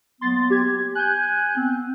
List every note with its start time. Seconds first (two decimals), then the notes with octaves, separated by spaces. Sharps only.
0.21 F#3 A#3 B3 C6 A6
0.50 G4 G#6
0.95 G#5 F#6 G6
1.56 B3 C4